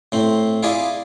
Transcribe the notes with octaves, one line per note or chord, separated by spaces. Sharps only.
A2 C4
E4 F4 G#4 D5